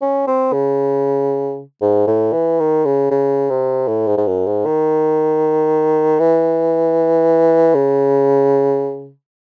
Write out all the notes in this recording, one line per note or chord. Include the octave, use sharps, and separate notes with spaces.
C#4
C4
C#3
G#2
A2
E3
D#3
C#3
C#3
C3
A2
G#2
G#2
F#2
G#2
D#3
E3
C#3